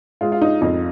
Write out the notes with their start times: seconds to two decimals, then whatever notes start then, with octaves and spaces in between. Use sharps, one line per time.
0.21 G#3 F4
0.32 F4
0.42 D#4
0.61 F2 D#4